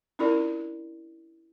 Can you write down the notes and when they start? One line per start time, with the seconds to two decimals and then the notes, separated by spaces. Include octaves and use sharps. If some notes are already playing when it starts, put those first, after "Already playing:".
0.19 C#4 D4 E4 F4 A#4 D5